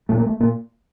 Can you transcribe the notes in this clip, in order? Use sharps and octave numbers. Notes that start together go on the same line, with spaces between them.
A#2 A3
A#3
A3
A#2 A#3